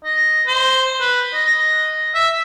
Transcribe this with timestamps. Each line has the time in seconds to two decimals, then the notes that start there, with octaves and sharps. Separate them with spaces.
0.05 D#5
0.47 C5
1.01 B4
1.34 D#5
2.15 E5